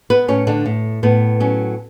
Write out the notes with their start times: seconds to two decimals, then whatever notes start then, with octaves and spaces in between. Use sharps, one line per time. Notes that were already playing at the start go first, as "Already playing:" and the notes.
0.10 B3 B4
0.28 A2 C#4 C#5
0.47 D3 D4
0.66 A2
1.03 A2 B3
1.40 F#3 C#4